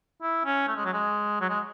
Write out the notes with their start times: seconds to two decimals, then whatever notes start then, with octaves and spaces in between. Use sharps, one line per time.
0.22 E4
0.45 C#4
0.68 A3
0.76 G#3
0.85 F#3
0.93 G#3
1.41 F#3
1.50 G#3